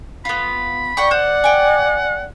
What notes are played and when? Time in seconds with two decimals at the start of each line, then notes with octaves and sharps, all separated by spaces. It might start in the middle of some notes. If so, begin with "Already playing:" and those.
0.25 B3 F4 B5
0.97 D5 F#5 G5 C#6
1.11 C5 F#5
1.44 G5 G#5